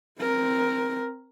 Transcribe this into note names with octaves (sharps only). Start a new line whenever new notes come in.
C4 A#4